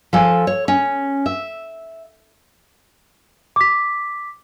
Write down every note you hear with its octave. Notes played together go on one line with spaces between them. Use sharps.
F3 A4 G#5
C#5
C#4
E5
D6 B6